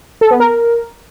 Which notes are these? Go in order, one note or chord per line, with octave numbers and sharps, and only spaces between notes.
A4
B3
A#4